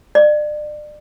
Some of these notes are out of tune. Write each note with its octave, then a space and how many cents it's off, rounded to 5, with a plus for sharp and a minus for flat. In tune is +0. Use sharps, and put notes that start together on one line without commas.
D5 +35